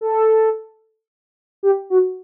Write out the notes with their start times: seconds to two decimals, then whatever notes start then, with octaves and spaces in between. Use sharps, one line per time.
0.01 A4
1.63 G4
1.90 F#4